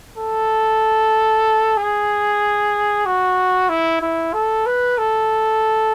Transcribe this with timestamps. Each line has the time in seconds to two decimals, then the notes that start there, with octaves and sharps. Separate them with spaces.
0.17 A4
1.77 G#4
3.06 F#4
3.69 E4
4.02 E4
4.33 A4
4.66 B4
4.98 A4